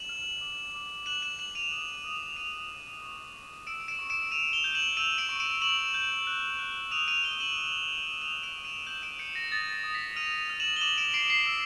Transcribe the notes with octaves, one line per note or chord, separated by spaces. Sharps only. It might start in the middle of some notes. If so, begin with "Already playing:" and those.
Already playing: E7 F#7
F6
D6
D6
F#6 E7 F#7
E7 F#7
F#6 E7 F#7
D#7 F7
D#6
D#6
F6 D#7 F7
F6
C#6
C#6
E6 D7 E7
D7 E7
C#6
D7 E7
C#6 D#7 F7
F7 G7
G6
E7 F#7
E6 D#7 F7
D7 E7
C#6
D7 E7
C#6 E7 F#7
G6
F#6
F#6
D#6 D#7 F7
D#7 F7
D#6 F7 G7
E7 F#7
G6
G6
D#6 D#7 F7
D7 E7
D#6
D#7 F7
G6 E7 F#7
D7 E7
G6 C#7 D#7
A#6
D#6 A6
A#6
D#6
B6
F6 D#7 F7
D#7 F7
F6
E7 F#7
G7
D6 E7 F#7
D7 E7
D6 C7 D7
C7
E6